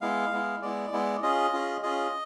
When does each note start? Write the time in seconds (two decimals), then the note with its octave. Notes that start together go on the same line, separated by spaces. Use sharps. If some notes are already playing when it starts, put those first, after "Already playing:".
0.01 G#3 B3 E4 F5
0.31 G#3 B3 E4
0.62 G#3 B3 E4 D5
0.92 G#3 B3 E4
1.22 C#4 F4 G#4 D#5
1.53 C#4 F4 G#4
1.83 C#4 F4 G#4 D#5